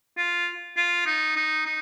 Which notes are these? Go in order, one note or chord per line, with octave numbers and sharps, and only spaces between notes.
F4
F4
D#4
D#4
D#4